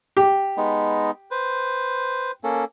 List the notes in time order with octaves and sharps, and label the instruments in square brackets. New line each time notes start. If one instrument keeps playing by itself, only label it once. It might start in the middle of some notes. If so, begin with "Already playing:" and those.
[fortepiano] G4
[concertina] G#3 B3 D#4
B4 C5
A#3 C#4 A4